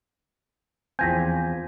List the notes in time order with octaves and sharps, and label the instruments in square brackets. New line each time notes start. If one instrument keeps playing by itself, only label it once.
[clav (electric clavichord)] E2 F3 C4 [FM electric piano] G#5 [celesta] G6 A#6 B6